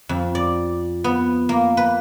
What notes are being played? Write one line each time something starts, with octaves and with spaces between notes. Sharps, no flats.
F2
D5
B3
A#3
B4